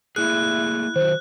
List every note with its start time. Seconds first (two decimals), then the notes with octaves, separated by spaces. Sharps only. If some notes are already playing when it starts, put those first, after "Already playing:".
0.16 A3 A#3 E4 G#4 F#6
0.96 D#3 F#3 C5